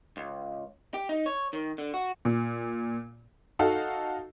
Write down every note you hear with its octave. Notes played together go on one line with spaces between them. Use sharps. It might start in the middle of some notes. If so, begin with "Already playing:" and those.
C#2
G4
D#4
C#5
D#3
D3
F#4
A#2
D#4 F#4 A4 F5